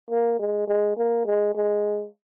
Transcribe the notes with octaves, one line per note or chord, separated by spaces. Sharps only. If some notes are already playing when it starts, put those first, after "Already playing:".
A#3
G#3
G#3
A#3
G#3
G#3